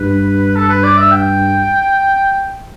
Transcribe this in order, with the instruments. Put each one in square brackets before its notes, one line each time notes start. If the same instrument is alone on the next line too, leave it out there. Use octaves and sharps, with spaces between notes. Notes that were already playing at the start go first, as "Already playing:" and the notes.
Already playing: [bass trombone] G2 [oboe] B4
[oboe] A4
B4
D5
E5
G5